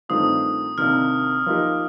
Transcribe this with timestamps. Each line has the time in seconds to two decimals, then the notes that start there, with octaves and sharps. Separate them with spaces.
0.09 G2 D#3 A3 C4 F4 D#6
0.78 C3 D#3 A#3 D4 F6
1.46 F3 A#3 D#4 G4